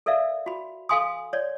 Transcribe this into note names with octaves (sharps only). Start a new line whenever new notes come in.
A4 A#4 D5 E5 F5
F#4 B5
A4 F5 G#5 C6 D#6
C#5 D5